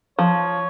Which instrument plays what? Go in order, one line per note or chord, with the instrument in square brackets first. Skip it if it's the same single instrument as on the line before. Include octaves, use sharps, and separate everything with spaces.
[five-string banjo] F3 [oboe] C#5